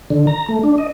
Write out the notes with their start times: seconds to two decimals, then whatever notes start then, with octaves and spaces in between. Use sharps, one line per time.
0.10 D3
0.27 A#5
0.49 A3
0.63 D4
0.78 D#5